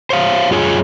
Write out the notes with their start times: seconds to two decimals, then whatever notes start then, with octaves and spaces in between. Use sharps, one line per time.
0.10 C5 C#5 F5
0.51 F#2 F4 G#4 C#5 G#5